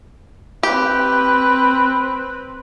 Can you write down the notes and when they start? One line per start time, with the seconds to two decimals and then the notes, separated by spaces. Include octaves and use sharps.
0.63 C4 G4 B4